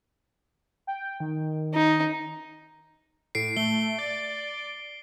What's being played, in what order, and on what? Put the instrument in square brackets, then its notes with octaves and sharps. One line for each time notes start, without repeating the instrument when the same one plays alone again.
[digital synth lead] G5
D#3
[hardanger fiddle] D#4
[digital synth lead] A2 [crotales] C7 D7
[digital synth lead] A3 [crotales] G7
[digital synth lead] D5